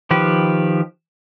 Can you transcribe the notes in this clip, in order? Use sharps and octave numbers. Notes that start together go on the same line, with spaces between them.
D#3 F3 G4 B4